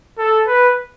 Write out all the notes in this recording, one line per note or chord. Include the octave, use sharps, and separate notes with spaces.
A4
B4